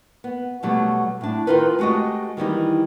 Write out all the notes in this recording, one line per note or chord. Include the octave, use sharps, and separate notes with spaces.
B3
B2 F#3 G3 A3
A2 D4
D#3 G#3 D#4 F4 A#4 B4
G#3 A3 F#4 G4 D#5
D#3 E3 G3 D#4